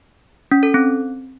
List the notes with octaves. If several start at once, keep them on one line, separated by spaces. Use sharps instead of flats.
C#4
A4
C4